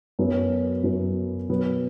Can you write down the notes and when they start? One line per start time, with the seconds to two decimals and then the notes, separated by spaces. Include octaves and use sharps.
0.19 F#2 F#3 B3
0.83 F#2 F#3 B3
1.49 B2 F#3 B3